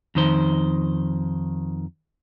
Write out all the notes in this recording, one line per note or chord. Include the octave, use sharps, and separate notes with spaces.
F2 D#3 C5